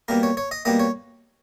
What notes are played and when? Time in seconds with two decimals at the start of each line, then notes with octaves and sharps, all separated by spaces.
0.08 B2 G3 A#3 A#4
0.23 C#5
0.37 C#5
0.51 D#5
0.65 B2 G3 A#3 D#5
0.79 C#5